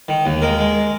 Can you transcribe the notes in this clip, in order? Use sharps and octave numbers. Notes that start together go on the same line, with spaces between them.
D#3
D#2
G#3 A#4
G#3